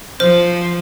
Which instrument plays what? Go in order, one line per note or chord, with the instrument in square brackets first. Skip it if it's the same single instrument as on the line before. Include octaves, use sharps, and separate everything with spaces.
[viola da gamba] F3 [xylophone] C5 F6